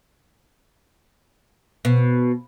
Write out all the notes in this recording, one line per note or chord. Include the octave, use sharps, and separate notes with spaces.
B2